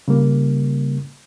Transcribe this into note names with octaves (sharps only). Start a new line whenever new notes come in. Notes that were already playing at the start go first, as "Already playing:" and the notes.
C#3 G3 A#3